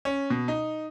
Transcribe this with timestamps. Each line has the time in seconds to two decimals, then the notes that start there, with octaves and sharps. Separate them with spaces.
0.05 C#4
0.30 B2
0.48 D#4